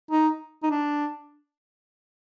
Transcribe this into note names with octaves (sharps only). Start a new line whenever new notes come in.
D#4
D#4
D4